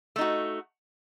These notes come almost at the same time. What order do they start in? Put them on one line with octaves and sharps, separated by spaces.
A3 D#4 F#4